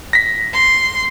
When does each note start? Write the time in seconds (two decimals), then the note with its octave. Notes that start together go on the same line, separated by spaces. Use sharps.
0.13 A#6 B6
0.52 C6